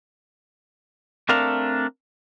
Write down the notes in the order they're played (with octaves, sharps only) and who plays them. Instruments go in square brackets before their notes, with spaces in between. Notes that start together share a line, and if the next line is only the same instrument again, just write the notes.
[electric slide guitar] A3 C4 D4 A#4 F5